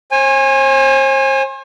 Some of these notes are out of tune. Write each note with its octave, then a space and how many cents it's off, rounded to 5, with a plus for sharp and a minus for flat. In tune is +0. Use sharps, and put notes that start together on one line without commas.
C5 +45 G#5 -15